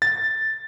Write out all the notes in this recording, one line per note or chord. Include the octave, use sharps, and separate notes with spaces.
A6